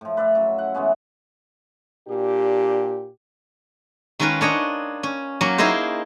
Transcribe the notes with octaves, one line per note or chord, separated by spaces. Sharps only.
A2 F3
B4 D5 E5 F5
C#3 F#3
F#5
E3 G#3 B3 C#4
A#2 D4 G4
D#3 G#3 C#4 F4 A#4 B4
D4 C#5 D#5 G5
C#4
F#3 A#3 C#4
D#4 E4 G#4 A#4 C5